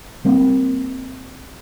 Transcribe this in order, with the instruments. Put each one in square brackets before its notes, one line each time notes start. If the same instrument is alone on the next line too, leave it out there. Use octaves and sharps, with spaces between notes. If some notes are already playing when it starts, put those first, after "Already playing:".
[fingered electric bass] G3 A#3 C4